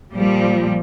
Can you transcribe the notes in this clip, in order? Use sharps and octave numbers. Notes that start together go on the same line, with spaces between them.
A#2 F3 G3